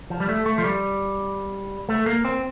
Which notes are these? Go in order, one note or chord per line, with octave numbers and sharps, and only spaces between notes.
F3
G3
A3
A3
F3
G3
A3
A#3
C4